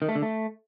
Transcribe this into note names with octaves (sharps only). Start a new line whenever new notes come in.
D#3
A3
D3
A3